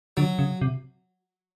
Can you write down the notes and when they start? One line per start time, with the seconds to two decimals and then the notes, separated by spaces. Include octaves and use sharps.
0.17 D3 F#3
0.39 C#3
0.61 C3